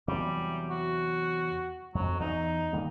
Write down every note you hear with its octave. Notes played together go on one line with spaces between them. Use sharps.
E2 C3 F#3 G3
F#4
F2 F#3
E2 D#4
D#3 G3 A#3